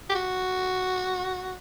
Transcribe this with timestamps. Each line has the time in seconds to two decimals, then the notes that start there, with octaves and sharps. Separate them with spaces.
0.10 G4
0.15 F#4